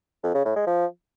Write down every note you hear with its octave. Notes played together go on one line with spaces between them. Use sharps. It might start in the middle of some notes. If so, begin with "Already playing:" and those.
F2
C#3
A2
G#3
F3